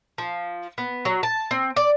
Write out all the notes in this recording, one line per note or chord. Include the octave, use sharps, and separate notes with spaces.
F3
B3
F#3
A5
C4
D5